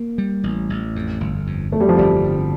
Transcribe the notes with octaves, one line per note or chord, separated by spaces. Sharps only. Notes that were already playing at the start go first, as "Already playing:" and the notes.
Already playing: A#3
G3
A1
A1
F2
G1
F2
F2 A3
G3
F3
G1 G3
D3